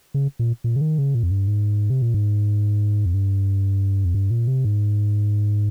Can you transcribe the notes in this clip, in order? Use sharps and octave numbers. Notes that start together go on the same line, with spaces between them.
C#3
A#2
A#2
C#3
D#3
C#3
A#2
F2
G2
G#2
C3
A#2
G#2
F2
G2
F2
G2
A#2
C3
G#2